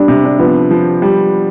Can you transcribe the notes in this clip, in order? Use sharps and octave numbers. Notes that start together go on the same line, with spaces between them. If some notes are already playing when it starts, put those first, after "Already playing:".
Already playing: G3 D4
C3
D4
F3 B3
F3
G3